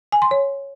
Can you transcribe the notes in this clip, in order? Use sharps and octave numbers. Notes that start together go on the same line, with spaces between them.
G#5
C6
C#5